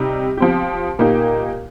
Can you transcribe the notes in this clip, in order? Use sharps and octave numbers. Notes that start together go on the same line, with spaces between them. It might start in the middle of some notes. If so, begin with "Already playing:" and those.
Already playing: C3 G3 D#4 G4
F3 C4 G4
A#2 A#3 D#4 G4